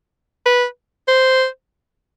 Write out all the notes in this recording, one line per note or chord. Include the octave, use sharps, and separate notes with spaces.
B4
C5